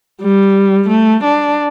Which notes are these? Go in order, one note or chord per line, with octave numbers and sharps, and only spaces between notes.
G3
A3
D4